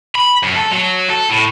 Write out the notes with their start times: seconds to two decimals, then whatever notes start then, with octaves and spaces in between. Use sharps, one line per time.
0.15 B5
0.43 F#2
0.56 A4
0.71 F#3
1.10 A4
1.30 A2